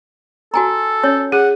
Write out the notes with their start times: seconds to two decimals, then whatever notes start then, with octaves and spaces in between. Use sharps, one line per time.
0.54 F#4 A4 G#5 A#5
1.04 C#4 C#5
1.32 G#4 F#5